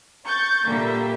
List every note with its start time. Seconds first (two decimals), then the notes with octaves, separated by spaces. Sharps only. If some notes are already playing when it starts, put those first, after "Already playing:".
0.25 C#6 G6 A6
0.66 A#2 D3 G3 A#3 E5